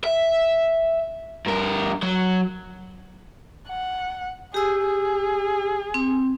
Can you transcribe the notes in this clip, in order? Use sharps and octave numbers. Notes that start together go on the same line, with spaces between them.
E5
G2 A#4
F#3
F#5
G4 G#4 E6
G#4
C4